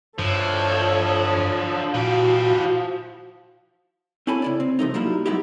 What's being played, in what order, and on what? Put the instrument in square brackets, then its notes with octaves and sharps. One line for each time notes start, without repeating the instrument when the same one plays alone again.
[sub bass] G2 [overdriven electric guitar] D3 E4 [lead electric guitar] F3 [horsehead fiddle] A4 C#5
[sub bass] A#2 [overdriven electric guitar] E3 G4 [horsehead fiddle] E4 F#4
[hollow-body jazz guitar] C4 C#4 E4 A4 G#5 B5
C#3 E4 D5
C4
C3 F3 A3 D#4
F#3 G3 A#3 D#4 E4
F#3 G#3 B3 D#4 E4 G4